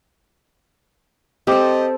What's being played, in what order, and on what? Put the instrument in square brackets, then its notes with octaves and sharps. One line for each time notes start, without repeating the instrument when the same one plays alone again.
[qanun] C4 A4 [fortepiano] G4 D6 [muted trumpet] D#5